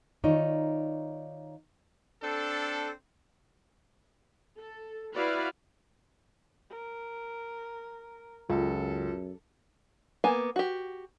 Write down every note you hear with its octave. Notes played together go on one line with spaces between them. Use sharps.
D#3 D#4 F4 C#5 D5
C4 D4 A4
A4
E4 F#4 B4 D5 F5
A#4
C#2 F#2 F4 A4
A#3 B3 G#5
F#4 G4